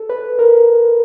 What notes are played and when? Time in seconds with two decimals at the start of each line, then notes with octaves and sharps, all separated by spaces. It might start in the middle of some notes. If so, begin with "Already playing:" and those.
Already playing: A4
0.09 B4
0.39 A#4